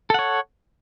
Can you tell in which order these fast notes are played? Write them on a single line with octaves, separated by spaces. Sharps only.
A4 F#5 C#5